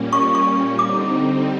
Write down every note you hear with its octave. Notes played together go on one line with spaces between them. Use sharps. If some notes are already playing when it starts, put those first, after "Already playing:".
Already playing: A#2 G3 A#3 C#4
C#6
C#6
D3 G3 C4 D#4 D6